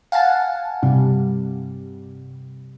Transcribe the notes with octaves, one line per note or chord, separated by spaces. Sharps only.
F5 F#5 G#5 A5
G2 C3 G3